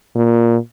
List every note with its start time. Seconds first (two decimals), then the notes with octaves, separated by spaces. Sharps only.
0.16 A#2